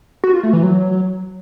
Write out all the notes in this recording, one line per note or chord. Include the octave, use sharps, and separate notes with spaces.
F#4
F4
A3
E3
F#3